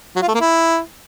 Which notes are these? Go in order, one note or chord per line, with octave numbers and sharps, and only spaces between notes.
F#3
F4
A3
A#3
E4